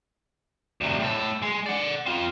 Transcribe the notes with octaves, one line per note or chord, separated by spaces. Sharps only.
D2 C3
A2 A4
G#3
D5 F#5
C4 F4